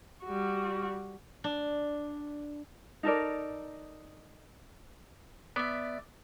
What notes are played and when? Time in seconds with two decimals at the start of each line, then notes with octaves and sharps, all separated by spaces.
0.23 G3 F#4
1.44 D4
3.03 D#4 A4 A#4 D5
5.56 B3 D5 E5